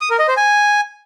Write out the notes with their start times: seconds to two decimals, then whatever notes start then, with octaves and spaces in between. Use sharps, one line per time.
0.01 D#6
0.10 A#4
0.19 D#5
0.28 C5
0.37 G#5